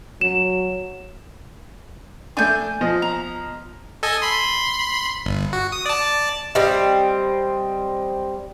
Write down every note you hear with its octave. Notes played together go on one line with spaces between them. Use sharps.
F#3 E7
A3 D4 G#5 G6
B2 F3 D#5
A#5
A4 D#5 G#5
B5 C6
G1
F#4
D#6
D5 A5
G3 C4 D#5